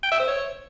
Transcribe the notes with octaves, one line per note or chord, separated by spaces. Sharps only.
G5
E5
C5
C#5